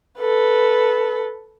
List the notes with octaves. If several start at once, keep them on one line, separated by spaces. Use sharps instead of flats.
A4 B4